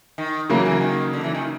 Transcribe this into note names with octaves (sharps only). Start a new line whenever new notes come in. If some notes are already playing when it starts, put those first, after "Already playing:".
D#3
C#3 E3 F#3 A#3
E3
D#3
D3
E3
D#3